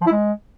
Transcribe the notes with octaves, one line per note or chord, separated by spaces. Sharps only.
F3
E4
G#3